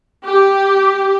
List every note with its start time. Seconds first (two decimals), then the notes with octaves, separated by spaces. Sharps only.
0.24 G4